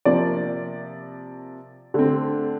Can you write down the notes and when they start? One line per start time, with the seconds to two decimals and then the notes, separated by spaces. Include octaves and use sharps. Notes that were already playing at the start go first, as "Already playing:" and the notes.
0.05 C3 F3 A#3 D5
1.94 D3 A3 C4